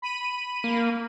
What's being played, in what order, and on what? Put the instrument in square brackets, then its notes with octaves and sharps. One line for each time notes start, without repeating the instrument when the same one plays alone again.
[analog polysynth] B5 D#7
[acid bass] A#3